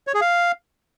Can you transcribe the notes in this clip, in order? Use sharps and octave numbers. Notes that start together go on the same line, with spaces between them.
C#5
G#4
F5